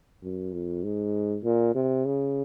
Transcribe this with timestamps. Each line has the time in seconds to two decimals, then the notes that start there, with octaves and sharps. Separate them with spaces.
0.23 F#2
0.53 F2
0.83 G#2
1.44 A#2
1.75 C3
2.05 C#3